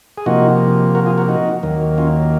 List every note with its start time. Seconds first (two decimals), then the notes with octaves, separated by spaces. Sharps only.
0.18 G#4
0.26 C3 F3 A#3 D#4 F#4
0.95 F#4 A#4
1.06 F4 G#4
1.17 F#4 A#4
1.28 D#4 F#4
1.63 D#2 D#3 F#3 A#3
1.98 C#4 F4